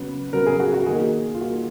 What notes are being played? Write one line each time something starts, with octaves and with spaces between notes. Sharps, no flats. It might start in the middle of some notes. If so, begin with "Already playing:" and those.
Already playing: C#3 F#3 B3 B4
C#3 F#3 B3 A#4
G#4
F#4
F#4
D#3 A#3 G#4
F#4
F4
D#3 A#3 F#4